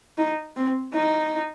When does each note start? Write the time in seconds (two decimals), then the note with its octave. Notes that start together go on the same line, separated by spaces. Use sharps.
0.18 D#4
0.56 C4
0.93 D#4